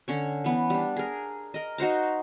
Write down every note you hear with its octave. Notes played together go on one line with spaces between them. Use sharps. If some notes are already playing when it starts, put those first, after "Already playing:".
D3 C#4 C#5
E3 B3
G3 D4
G#4 A#4
A#4 D#5
D#4 F#4 C5 A#5